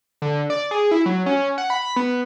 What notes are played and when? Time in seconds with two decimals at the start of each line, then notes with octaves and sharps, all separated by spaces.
0.22 D3
0.50 D5
0.71 G#4
0.91 E4
1.06 F#3
1.26 C#4
1.58 F#5
1.70 B5
1.96 B3